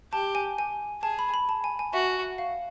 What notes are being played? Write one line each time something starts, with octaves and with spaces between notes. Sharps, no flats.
G4 A5
G#5
G#5
G#4 A5
B5
B5
A5
G#5
G#5
F#4 E5
F5